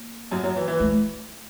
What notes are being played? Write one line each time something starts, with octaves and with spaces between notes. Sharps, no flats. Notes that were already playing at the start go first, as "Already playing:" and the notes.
Already playing: A#3
F#2 F#3
F#2 F#3
E3
E3
A3